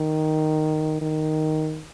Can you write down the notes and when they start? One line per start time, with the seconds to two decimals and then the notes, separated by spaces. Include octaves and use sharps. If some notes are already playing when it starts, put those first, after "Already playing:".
Already playing: D#3
1.01 D#3